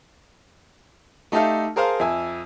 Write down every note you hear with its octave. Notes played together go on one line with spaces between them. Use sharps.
A3 D#4 G4 A4 E5 F5
G#4 A#4 C5 F5 A5 A#5
F2 E5 G#5 E6